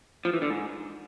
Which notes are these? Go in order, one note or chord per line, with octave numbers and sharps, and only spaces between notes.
F3
E3
D3
G#2